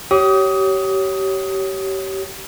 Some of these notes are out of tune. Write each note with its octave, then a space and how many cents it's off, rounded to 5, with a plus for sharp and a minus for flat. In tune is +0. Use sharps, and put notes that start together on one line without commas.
G4 -30 C#5 +0 D#6 +15